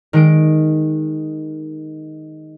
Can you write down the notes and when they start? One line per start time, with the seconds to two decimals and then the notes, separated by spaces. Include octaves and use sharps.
0.13 D#3 G#3 D7